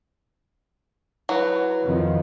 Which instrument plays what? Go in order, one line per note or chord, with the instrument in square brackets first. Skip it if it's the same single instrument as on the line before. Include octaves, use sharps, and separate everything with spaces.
[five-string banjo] F#3 [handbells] E4 B4
[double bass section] F2 D#3 F3